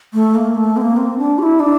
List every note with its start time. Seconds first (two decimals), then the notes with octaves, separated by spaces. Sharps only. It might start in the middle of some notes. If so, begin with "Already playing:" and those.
0.14 A3
0.35 A#3
0.55 A3
0.77 C4
0.81 A#3
0.97 C4
1.18 D4
1.38 G4
1.43 E4
1.60 D4